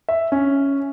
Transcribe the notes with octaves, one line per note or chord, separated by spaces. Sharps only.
E5
C#4